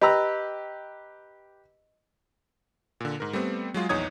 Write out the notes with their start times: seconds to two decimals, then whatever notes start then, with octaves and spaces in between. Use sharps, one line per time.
0.01 G4 B4 D#5 A#5 B5 E6
3.00 A#2 D3
3.20 G#2 A#4
3.33 G3 A3 B3 C4
3.74 F#3 G#3 F4 G#4
3.89 A#1 E2 D#4 C#5 D#6 G#6